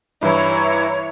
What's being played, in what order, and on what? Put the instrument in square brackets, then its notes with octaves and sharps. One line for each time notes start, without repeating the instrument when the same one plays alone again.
[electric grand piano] G2 E3 [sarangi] E4 [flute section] C#5 A#5